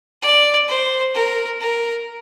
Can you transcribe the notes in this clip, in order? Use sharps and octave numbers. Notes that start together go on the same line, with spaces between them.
D5
C5
A#4
A#4